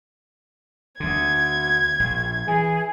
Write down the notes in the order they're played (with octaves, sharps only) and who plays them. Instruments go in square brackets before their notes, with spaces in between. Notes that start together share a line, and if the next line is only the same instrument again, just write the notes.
[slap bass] D2 D3 [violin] G#6
[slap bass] A#1
[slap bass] E3 [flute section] G#4